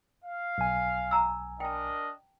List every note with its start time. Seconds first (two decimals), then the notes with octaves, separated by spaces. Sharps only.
0.24 F5
0.58 B1 G#5
1.11 A5 A#5 E6
1.60 D4 A#4 D#5 G5 A5